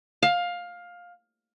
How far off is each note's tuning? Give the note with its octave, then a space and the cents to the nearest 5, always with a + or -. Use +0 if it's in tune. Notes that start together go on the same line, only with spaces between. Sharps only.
F5 +15